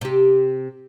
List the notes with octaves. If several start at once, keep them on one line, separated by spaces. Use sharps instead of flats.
C3 G4